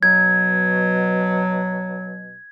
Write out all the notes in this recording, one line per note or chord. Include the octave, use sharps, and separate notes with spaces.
B2 F#3 G#6